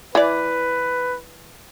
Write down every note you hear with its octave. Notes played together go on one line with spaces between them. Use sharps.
E3 B4 D5